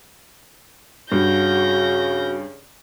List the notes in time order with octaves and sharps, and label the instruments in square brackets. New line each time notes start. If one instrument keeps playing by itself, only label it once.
[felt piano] G2 [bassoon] C#3 [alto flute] F#4 [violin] G6 A#6